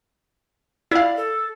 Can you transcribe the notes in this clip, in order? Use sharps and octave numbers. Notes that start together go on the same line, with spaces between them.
E4 D5 F5
A4